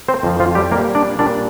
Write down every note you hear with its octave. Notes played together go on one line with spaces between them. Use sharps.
C4 C5
F2 F3
F3 F4
G3 G4
A#2 G3 A#3 A#4
D4 D5
A#2 G3 D4 D5